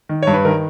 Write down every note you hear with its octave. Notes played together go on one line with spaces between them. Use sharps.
D#3
G2 C#5
B4
D#3 A#4